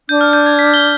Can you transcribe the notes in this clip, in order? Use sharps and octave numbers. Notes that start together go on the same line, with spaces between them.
D4 G6
F6
G6
G#6
B6
G7